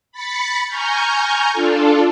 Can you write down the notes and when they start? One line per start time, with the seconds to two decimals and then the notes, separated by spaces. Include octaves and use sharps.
0.12 B5 A6 B6 C#7
0.68 G#5 A#5 C#6 F6 G6
1.53 D4 F4 A4